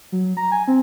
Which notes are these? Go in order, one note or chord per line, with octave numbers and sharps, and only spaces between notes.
F#3
A#5
G#5
C4